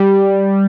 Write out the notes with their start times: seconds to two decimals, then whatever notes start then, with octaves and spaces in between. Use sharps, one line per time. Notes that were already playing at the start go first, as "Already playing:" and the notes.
Already playing: G3